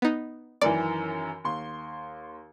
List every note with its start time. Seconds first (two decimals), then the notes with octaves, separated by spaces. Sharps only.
0.02 B3 D#4
0.61 F#2 D#3 E3 D5
1.44 D#2 C6